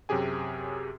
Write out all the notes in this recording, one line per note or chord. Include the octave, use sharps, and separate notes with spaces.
F#2 C3 C#4 G4 G#4 G#5